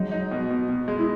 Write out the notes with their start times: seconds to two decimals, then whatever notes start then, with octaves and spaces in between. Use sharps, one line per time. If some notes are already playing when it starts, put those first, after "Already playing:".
Already playing: F#3 G#3 D#4
0.12 D#4
0.31 B2
0.50 B2
0.69 B2
0.88 G#3
0.99 E4